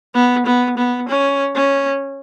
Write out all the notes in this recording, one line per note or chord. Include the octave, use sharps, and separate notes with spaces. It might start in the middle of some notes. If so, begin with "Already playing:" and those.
B3
B3
B3
C#4
C#4